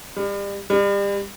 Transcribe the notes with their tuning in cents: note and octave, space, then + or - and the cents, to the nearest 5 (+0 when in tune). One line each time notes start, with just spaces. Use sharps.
G3 +35
G3 +35